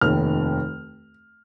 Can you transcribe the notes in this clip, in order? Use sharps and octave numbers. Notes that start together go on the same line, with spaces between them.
F1 D#2 D#3 F6